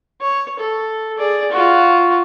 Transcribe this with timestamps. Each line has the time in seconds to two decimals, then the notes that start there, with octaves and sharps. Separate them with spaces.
0.21 C#5
0.59 A4
1.18 G#4 D5
1.52 F4 F#4